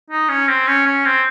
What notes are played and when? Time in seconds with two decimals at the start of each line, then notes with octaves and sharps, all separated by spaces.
0.10 D#4
0.29 C#4
0.48 C4
0.67 C#4
0.86 C#4
1.05 C4